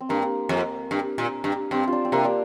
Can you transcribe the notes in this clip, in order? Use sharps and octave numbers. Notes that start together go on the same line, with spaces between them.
C4
G2 A#3
F2
G2
A#2
G2
G2 C4
D4 F4
C4
C3 A#3
D4